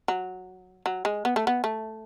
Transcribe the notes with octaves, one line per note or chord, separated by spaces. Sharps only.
F#3
F#3
G#3
B3
A3
B3
A3